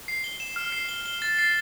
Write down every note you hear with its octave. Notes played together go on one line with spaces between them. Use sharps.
C7
G7
E7
F6
C7
G7
G7
A6
C7